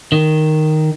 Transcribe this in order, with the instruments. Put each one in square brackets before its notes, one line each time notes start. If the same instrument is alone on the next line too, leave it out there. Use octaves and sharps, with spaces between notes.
[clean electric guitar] D#3